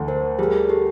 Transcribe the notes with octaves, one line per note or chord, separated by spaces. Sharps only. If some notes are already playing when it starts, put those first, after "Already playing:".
Already playing: D2 A3
A#4 C5
G3 G#4 A#4
G4 A4